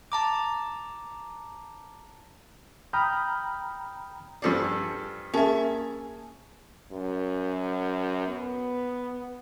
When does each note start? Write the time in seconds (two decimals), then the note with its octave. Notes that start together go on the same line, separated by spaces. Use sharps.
0.12 A5 A#5 D6
2.93 G5 A#5 B5 D#6 F6 G6
4.42 G2 F3 G#4 A4 D5 G#5
5.33 A#3 C#4 G#4 E5 A5
6.92 F#2
8.27 B3